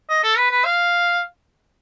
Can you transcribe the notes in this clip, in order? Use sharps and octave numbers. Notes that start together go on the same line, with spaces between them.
D#5
A4
B4
B4
F5